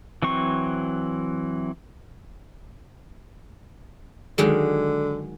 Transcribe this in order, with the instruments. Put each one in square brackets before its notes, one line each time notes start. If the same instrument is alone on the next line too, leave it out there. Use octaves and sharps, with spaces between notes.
[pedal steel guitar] E3 F#3 C4 C#6
[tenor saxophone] D3 [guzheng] D#3 F#3 G#3